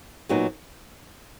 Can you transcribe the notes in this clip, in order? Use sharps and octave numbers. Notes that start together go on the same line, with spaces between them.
A#2 F#3 B3 D#4